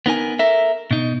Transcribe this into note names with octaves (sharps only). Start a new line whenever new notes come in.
B3 D#4 A#4 G#5
A4 A#4 E5
B2 D#4